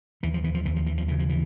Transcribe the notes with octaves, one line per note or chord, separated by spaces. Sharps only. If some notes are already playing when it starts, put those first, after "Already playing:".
D#2 E3
F3
E3
F3
D#2 E3
F3
E3
F3
C#3 E3
F3
E3